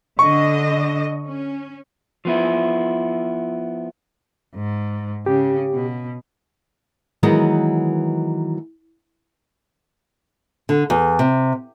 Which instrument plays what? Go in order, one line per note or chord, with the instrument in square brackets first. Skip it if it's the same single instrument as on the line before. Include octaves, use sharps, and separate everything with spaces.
[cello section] D3 D#5 [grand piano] C#6
[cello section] C#4
[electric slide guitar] F3 B3 E4
[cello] G#2
[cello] C#3 [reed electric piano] G4
[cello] B2
[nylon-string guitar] D#3 E3 F#3 G#3 B3 D#5
D3
E2
C3